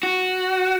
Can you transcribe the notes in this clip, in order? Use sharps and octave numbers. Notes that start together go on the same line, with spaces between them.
F#4